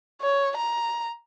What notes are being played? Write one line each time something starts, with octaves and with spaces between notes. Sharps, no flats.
C#5
A#5